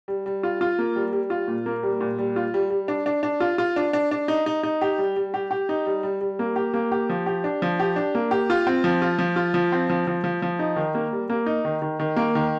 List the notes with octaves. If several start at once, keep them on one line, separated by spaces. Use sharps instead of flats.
G3
G3
F4
F4
A#3
G3
G3
F4
A#2
A#3
G3
A#2
G3
F4
G3
G3
D4
D4
D4
F4
F4
D4
D4
D4
D#4
D#4
D#4
G4
G3
G3
G4
G4
D#4
G3
G3
G3
A#3
G4
A#3
G4
F3
G4
D4
F3
G4
D4
A#3
G4
F4
C4
F3
F4
F3
F4
F3
C4
F3
F3
F3
F3
D#4
D#3
A#3
G3
A#3
D#4
D#3
D#3
D#3
A#3
D#3